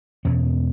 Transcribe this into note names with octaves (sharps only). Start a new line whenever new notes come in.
E2 B2 C#4